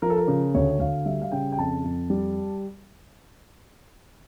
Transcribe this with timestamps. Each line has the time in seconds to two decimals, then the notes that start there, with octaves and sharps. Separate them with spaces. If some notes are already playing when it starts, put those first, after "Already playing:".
0.02 F3 A#4
0.10 A4
0.17 A#4
0.28 C#3
0.54 D2 C#5
0.80 D2 F5
1.06 G3 E5
1.21 F5
1.32 C#3 G5
1.52 G5
1.58 F2 A5
1.84 F2
2.10 G3